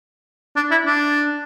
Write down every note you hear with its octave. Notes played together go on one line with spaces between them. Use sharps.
D4
E4
D4